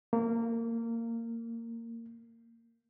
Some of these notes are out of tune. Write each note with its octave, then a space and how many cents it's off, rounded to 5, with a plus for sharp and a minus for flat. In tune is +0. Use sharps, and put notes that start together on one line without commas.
A#3 -20